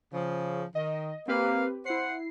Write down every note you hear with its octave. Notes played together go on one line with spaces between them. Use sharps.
C#3 F3
D#3 D#5
A#3 C4 G4 B4 F5
E4 C5 F#5 C7